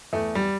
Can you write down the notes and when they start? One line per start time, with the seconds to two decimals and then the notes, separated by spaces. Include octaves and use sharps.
0.13 E2 A3
0.35 G3